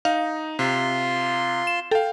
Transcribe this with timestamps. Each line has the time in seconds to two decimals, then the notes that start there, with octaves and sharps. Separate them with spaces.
0.05 D#4 F5
0.59 C3 F4 C6
1.67 E7
1.91 A4 F5 G5